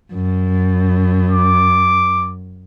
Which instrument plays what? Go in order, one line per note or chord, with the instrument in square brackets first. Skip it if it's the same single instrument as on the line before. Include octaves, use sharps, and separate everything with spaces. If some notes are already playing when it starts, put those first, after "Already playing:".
[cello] F#2
[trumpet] D6